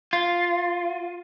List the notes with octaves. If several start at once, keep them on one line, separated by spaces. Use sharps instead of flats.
F4